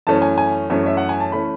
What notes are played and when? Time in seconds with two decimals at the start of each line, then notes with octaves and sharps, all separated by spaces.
0.07 F#2 E3 A3 C#4 A5
0.22 G#5
0.38 G#5
0.70 F#2 E3 A3 C#4
0.86 E5
0.97 F#5
1.09 G#5
1.20 A5
1.32 E3 A3 C#4 B5